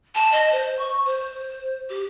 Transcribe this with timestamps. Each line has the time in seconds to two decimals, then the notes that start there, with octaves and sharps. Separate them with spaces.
0.15 A5
0.32 D#5
0.52 C5
0.79 C#6
1.06 C5
1.90 G4